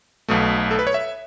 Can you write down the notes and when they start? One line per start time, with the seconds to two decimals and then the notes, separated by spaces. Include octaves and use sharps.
0.28 B1 B2 A3
0.71 A4
0.79 B4
0.87 C#5
0.94 E5